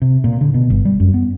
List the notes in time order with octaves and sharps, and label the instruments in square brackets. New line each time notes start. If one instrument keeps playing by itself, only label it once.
[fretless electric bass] C3
A#2
D3
B2
G1
G3
F#2
B3